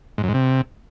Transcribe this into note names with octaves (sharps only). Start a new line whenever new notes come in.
G#2
F#2
G#2
C3